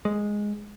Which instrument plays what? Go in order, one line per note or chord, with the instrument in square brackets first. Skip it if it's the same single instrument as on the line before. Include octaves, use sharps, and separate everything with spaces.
[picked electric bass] G#3